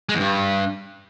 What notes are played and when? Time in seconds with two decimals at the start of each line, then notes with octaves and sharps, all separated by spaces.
0.09 G#3
0.15 E2
0.20 G2